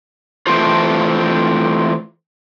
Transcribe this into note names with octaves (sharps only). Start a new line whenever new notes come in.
E3 A3 C4 D4 F4 C5